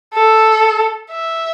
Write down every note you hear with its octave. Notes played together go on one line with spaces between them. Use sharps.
A4
E5